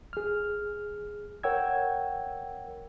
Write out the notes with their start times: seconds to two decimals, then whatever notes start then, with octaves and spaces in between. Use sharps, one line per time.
0.13 G#4 F6
1.43 A#4 C#5 F#5 G5 E6 G#6